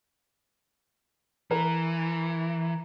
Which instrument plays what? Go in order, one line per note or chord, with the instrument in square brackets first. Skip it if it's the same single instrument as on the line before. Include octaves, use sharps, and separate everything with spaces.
[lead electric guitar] E3 [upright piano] A#4